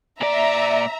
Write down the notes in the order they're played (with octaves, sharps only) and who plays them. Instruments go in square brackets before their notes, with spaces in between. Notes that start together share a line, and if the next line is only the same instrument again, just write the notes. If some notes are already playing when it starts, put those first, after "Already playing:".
[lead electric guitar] A#2 D5 [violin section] E5 A#5